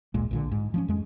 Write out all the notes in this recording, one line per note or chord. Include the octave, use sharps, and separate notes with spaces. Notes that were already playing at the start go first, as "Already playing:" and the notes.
A1 D2 A#2 G#3
A#1 A#2 D3
G#2
F3 A3 C#4
F2 G#3